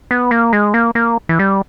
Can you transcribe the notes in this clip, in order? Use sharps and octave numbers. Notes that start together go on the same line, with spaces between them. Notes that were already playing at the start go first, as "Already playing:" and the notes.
B3
A#3
G#3
A#3
A#3
E3
G3